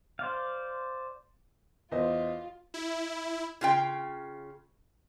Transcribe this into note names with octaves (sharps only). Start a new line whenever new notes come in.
C5 D5 F5
E2 F4 C5 D#5
E4
C#3 F4 G5